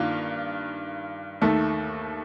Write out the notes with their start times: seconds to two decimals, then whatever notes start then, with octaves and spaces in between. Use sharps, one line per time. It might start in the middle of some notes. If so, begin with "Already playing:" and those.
Already playing: G2 D#3 A#3 F4
1.41 D#2 D#3 A3